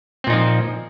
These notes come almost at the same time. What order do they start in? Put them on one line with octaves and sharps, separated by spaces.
C4 A#2 D#4 F3